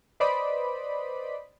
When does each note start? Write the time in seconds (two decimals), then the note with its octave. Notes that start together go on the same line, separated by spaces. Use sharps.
0.20 B4 C5 D5 D#5 B5